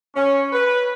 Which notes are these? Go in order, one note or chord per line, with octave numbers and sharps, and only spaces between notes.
C#4
B4